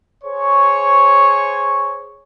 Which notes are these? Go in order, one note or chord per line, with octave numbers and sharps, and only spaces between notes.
G#4 C5 C#5 C#6